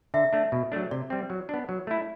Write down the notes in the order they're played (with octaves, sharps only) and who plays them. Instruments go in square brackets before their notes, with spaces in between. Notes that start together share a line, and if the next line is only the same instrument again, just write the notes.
[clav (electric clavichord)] D3 [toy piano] E5
[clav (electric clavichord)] A3 D4
B2
F#3 A3 D4
[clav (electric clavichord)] C3 [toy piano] D5
[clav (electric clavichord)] G3 C4
F#3
B3 D4
F#3
A3 E4